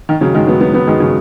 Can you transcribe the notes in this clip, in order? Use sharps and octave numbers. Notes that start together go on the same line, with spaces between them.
D#3
C#3 F#3
D#3 G#3
F#3 B3
F#3 B3
F#3 B3
D#3 G#3
C#3 F#3